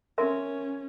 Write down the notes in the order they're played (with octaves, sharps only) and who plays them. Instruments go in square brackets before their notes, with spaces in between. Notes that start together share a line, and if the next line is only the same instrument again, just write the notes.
[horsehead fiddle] C#4 [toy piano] A#4 E5 C6